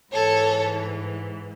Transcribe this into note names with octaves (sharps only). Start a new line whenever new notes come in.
G#2 E3 A4 C#5